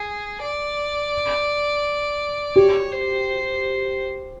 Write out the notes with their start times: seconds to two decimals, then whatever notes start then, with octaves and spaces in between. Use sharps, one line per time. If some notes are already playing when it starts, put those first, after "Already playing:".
Already playing: G#4
0.42 D5
2.56 G4 C#5
2.92 C5